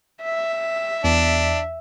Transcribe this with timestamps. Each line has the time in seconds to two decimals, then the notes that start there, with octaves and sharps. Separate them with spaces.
0.22 E5
1.04 E2 D4